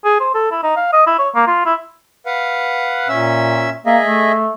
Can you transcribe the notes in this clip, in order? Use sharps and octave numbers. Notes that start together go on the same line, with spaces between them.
G#4
C5
A4
E4
D#4
F5
D#5
E4
C#5
A#3
F4
E4
B4 F5 F#5
A#2 C#4 E5 E6
A#3 G#4 D#5 E5
A3